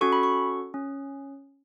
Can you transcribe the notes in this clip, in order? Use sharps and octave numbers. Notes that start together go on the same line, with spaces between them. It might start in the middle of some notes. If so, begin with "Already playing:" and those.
C#4 F#4 A4 C#6
B5
C#6
C#4